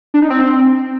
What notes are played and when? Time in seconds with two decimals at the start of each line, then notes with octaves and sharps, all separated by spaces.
0.14 D4
0.22 D#4
0.30 C4